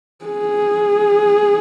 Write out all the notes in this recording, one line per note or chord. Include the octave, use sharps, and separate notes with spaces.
G#4